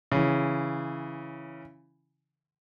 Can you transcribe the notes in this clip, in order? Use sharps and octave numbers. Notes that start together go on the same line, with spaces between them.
C#3 E3